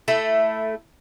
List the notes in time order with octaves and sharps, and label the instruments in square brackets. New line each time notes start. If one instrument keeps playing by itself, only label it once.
[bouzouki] A3 E4 A4